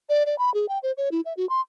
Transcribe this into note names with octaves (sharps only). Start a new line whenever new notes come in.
D5
D5
B5
G#4
G5
C5
C#5
E4
E5
F#4
C6